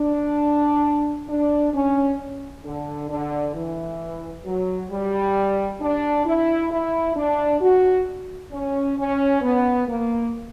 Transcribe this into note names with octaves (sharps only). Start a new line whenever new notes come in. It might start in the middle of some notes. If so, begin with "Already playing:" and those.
Already playing: D4
D4
C#4
D3
D3
E3
F#3
G3
D4
E4
E4
D4
F#4
C#4
C#4
B3
A#3